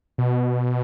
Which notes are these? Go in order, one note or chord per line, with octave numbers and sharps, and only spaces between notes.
B2